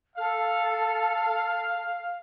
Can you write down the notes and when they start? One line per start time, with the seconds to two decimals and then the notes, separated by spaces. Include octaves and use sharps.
0.16 A4 F5